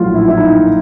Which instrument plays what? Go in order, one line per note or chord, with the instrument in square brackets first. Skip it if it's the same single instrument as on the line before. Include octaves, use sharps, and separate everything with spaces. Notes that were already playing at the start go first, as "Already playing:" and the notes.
Already playing: [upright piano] A#1 A2 F#3 F4
E4
E4
D#4